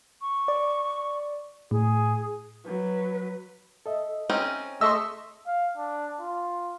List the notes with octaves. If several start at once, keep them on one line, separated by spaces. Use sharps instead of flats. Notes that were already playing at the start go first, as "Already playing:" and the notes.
C#6
D5
A2 G#4
F#3 B4
A4 D#5 E5
C4 C#4 D#4
A3 G#4 D#5 E5 C6 C#6 E6
F5
D4
F4